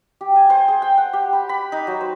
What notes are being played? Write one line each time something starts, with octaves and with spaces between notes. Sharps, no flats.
G4
G#5
C5
G#4
G5
F#5
G4
B5
B5
D#4
F#3
C5